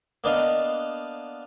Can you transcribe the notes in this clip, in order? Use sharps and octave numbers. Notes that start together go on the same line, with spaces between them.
A#3 B3 D4 D#5 F5